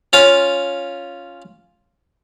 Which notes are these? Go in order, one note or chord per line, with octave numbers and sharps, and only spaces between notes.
C#4 F4 F5